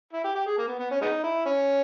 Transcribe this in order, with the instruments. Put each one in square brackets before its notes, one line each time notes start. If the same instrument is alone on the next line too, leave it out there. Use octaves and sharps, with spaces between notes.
[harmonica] E4
G4
G4
G#4
A#3
B3
B3
C#4
G#3 B3 D#4
E4
C#4